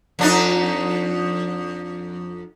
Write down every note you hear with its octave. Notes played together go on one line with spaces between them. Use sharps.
F2 D4 D#4